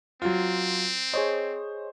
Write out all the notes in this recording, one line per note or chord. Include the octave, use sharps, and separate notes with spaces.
F#3 C4 F4
G#4 C5 C#5 D#5